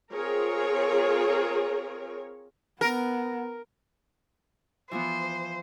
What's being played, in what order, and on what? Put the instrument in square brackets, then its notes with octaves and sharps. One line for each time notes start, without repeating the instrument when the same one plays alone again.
[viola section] C4 F4 G#4 A#4 C#5
[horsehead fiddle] B3 [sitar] A#4
[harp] E3 F3 B3 [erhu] C5